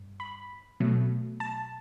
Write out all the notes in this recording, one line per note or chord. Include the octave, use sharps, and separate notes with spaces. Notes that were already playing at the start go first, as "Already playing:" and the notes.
Already playing: G2
B5
B2 F#3 A3
A5